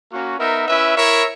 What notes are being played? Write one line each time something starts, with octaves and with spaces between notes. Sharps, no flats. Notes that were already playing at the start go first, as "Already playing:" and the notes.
A#3 C#4 F#4
B3 D#4 A#4 E5
C#4 E4 B4 E5
E4 A#4 C#5 E5